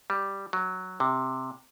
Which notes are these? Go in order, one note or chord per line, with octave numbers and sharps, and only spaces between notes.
G3
F#3
C3